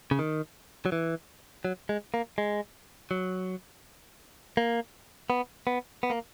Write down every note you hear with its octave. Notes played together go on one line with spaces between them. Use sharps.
C#3
D#3
F#3
E3
F#3
G#3
A#3
G#3
F#3
A#3
B3
B3
B3
A#3